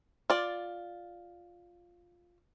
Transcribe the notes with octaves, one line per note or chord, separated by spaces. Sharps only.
F4 D5